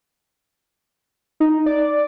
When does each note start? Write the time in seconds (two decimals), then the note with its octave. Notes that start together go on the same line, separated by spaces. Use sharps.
1.40 D#4
1.66 D5